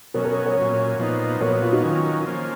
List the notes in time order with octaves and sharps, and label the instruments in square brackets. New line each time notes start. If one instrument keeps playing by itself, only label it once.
[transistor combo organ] B2 F#3 C#4 [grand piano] A#4 C#5
[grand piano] A#4 C#5
A#4 C#5
[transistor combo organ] A#2 F#3 C#4
A#2 F3 B3 D#4
[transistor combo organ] A#2 F#3 B3 [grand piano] A#4 C#5
[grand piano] F4
D#4 F#4
[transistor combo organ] D#3 F#3 C#4 [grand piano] F4
[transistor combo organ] F3 A#3 C#4